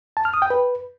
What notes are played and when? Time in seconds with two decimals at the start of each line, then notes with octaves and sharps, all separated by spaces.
0.17 A5
0.25 F6
0.34 D#6
0.42 G5
0.50 B4